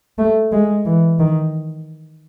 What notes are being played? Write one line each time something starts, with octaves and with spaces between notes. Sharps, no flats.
A3
G#3
E3
D#3